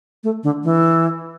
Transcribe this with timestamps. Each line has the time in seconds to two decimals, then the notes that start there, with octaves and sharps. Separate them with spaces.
0.24 A3
0.44 D3
0.64 E3